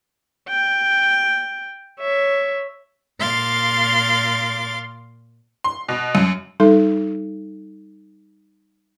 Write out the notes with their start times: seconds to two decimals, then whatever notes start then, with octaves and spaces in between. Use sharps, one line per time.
0.49 G5
2.00 C#5 E5
3.19 A#2 F5 C6 D6 A6
5.64 C6
5.89 B2
6.15 F#2
6.60 G3 D#4 A4